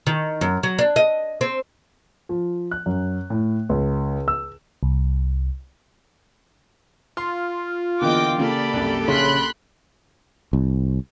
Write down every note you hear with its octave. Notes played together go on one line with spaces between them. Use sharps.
D#3
F#2
F#3
D4
D#5
C4
F3
F#6
F#2
A2
C#2
E6
C2
F4 C6
E2 D3 A#3 D#5 G5 D6
C#3 A#3 G4 A4 D5 B5
C2 F#2
A#1 C#3 C#4 B5 C6 F#6
C2